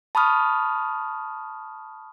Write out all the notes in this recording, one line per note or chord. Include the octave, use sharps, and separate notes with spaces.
A5 B5 C#6 D#6 F6